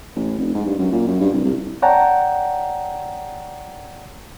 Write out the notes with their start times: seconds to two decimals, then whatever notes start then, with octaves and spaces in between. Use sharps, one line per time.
0.16 A1
0.38 F1
0.54 G#2
0.66 G2
0.78 F#2
0.92 A#2
1.07 F#2
1.20 G2
1.33 C2
1.45 C2
1.82 C#5 D5 F#5 G5 A5 A#5